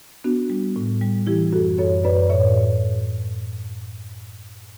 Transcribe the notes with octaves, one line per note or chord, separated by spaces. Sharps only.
B3 D4 F#4
G3
A2
G3
E3 E4 G4
F#2 F#4 A4
F#2 A4 C#5
F#2 B4 D5
A2 C#5 E5